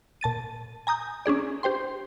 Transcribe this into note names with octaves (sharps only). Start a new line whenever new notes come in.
A#2 A5 A6 D#7
G#5 A#5 D#6 G6
C#4 D4 G#4 D5
G4 C5 G5 C6